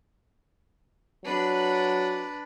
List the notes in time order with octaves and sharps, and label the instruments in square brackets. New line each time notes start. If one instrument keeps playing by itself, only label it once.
[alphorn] F#3 [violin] D4 B4